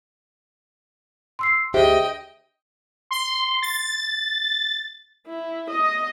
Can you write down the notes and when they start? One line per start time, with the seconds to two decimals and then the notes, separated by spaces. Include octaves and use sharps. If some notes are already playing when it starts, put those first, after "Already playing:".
1.39 C6 E6 C7
1.74 D2 G4 G#4 C5 D#5 E5 G5
3.11 C6
3.62 A6
5.27 E4
5.70 D#5